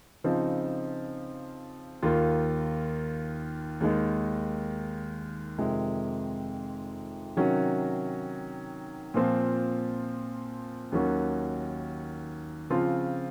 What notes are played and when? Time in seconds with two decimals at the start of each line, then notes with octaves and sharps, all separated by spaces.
0.24 C#3 F3 C4 D#4
2.02 D#2 D#3 A#3 F4
3.80 D#2 D#3 G#3
5.58 F2 C3 D#3 G#3
7.36 C3 D#3 F#3 C#4 F#4
9.14 A#2 F3 C4
10.92 D#2 D#3 F#3 C#4 F#4
12.70 C#3 F3 C4 F4